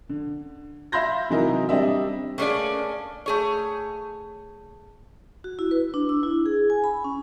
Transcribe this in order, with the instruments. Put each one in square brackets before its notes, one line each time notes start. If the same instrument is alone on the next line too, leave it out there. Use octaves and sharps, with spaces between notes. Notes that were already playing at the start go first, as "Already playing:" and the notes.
[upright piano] D3
E5 F5 B5 C6 G6 A#6
C3 E3 F#3 D#4 E4 A#4
G3 C4 D4 D#5 E5
[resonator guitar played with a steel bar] A3 A#3 C#4 D4 G#4 D5
A3 G#4 C#5
[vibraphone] F#4
E4
B4
D4
E6
E4
G#4
G#5
B5
C#4